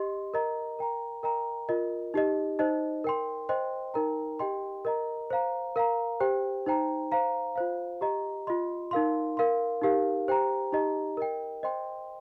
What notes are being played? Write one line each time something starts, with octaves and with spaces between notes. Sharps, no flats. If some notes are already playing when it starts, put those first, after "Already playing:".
Already playing: G4 D#5 C6
A#4 D#5 A#5
A#4 G5 A#5
A#4 D#5 G5 A#5
F4 A#4 D#5
D#4 G4 D#5
D#4 C5 D#5
A#4 G5 C6
C5 D#5 G5 C6
D#4 A#4 G5 A#5
G4 D#5 G5 C6
A#4 D#5 A#5
C5 F5 A#5
A#4 F5 A#5
G4 C5 G5
D#4 C5 G5 A#5
C5 F5 A#5
F4 C5 F5
G4 D#5 A#5
F4 D#5 C6
D#4 A#4 F5 C6
A#4 F5 C6
D#4 G4 A#4 F5
G4 C5 G5 A#5
D#4 G4 D#5 A#5
A#4 D#5 G5
C5 D#5 G5 C6